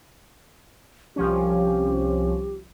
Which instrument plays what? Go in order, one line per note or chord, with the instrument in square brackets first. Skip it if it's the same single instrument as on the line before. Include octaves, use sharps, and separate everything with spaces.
[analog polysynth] C2 F3 C#4 [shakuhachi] G4